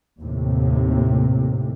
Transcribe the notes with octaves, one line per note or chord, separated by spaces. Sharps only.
D#2 A2 C3